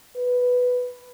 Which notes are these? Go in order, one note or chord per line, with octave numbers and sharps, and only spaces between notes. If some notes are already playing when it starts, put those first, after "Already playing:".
B4